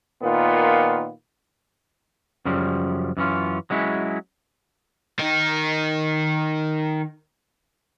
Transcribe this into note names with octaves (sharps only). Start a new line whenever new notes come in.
A#2 D#3 B3 F4
F#2 C#3 F3 G3
F#2 E3 C#4 F4
F#3 G#3 C#4 E4
D#3 D#4